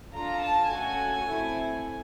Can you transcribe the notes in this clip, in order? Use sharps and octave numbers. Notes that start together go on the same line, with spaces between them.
D4 F4 A4 A#5
A5
A3 C#4 F#4 A4 G#5
A3 C4 E4